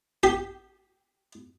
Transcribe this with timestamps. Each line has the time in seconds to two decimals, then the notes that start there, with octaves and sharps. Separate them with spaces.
0.23 G4